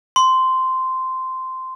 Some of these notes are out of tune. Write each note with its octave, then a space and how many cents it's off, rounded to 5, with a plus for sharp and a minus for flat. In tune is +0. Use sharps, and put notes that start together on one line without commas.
C6 -10